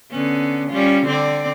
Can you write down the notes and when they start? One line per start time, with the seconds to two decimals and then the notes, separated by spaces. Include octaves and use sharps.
0.10 D3 B3 C#4
0.70 G3 C#4 F4
1.06 D3 C4 D5